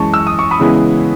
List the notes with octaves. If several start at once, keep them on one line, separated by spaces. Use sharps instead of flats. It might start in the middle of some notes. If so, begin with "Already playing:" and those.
Already playing: F#2 E3 G#3 A5 C#6
E6
D#6
C#6
B5 D#6
C#3 E3 G#3 B3 E4